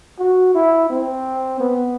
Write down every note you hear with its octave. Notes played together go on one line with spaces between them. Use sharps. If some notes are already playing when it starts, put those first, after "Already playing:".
F#4
E4
C4
B3